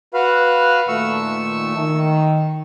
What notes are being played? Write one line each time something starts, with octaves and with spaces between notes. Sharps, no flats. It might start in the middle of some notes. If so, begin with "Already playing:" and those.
F#4 B4 F5
A#2 D#3 A3 C#6 E6
D#3